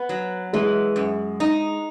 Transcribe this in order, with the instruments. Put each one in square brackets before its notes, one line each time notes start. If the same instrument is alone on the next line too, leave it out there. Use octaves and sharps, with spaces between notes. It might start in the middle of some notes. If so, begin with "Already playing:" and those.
Already playing: [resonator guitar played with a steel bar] B3
F#3
[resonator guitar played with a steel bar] E3 [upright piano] G#3
[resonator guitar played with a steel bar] F#2
D#4